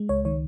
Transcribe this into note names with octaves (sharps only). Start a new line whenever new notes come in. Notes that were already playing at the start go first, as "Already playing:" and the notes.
Already playing: G#3
C#2 C#5
D#3 C#5